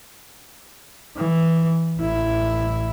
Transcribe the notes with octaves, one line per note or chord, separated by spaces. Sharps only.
E3
A1 E4